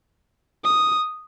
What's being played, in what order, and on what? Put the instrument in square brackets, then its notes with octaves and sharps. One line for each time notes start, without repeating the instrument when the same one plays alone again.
[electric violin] D#6